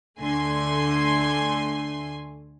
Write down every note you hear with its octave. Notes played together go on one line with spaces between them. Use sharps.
D2 D3 A3 G#5 C6